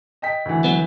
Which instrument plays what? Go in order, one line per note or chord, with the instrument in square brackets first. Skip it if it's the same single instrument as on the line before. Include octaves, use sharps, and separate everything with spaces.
[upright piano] D#5 G5 B6
D2 E3
[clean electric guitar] F#3 B3